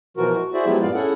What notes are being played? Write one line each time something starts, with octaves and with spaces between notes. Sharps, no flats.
B2 E3 F3 F#4 A#4
F#4
E4 F#4 G#4 C5 D5 E5
F3 F#3 G#3 B3 E4 G4
G2 A#2 B3 D5 F5
C#4 E4 G#4 A4 F#5